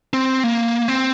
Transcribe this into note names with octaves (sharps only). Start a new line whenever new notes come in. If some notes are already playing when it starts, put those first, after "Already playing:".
C4
A#3
C4